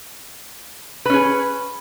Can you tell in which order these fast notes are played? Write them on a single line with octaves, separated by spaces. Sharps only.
B4 C#4 G#4